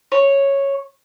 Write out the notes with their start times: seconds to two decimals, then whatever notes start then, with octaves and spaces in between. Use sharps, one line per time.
0.12 C#5